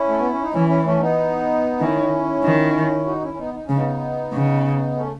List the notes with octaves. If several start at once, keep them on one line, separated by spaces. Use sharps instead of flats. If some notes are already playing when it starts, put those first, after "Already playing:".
Already playing: C#4 E4
A3
B3
C#4
D#4
E3 C#4 E4
C#4 E4
A3 C#4
B3 D#4
D#3 C#4 E4
D#3
D#4 F#4
C#4 E4
C#4
B3 D#4
D#4
C#3 C#4
B3 D#4
C#3
A3 C#4